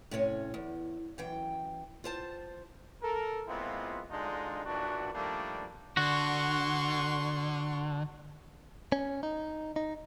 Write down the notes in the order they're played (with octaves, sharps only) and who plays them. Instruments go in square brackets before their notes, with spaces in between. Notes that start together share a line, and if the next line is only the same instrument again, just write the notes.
[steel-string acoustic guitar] A2 C3 C#4 C#5
E2
F#2 E3 G5
F4 C5 A5
[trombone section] A4 A#4
A#2 G#3 B3 C4 E4 F4
A1 D2 G#3 D4 D#4 F4
B1 A#2 E3 D4 F#4
D#3 F3 G3 A3 A#3 D4
[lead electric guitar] D3 [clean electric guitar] F#4 [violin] C6 C#6
[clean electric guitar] C#4
D#4
D#4